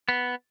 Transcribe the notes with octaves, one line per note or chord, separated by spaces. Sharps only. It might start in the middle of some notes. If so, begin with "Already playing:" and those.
B3